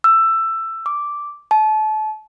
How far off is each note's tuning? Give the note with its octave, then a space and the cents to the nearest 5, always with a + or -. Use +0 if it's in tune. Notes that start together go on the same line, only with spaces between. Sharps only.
E6 +15
D6 -5
A5 -30